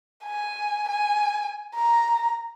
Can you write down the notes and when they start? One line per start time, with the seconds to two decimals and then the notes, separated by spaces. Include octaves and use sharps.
0.24 G#5
0.89 G#5
1.75 A#5